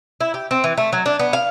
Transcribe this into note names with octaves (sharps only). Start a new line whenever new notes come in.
E4
G4
C4
E3
A3
F#3
D4
B3
F5